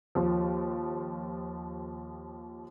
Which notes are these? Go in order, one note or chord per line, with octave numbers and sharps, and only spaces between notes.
D#2 F3